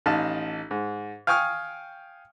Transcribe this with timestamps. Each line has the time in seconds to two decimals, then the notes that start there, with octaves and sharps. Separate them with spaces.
0.06 A1 D#4 F5 A5
0.71 G#2
1.27 F5 G5 G#5 C#6 D#6 F6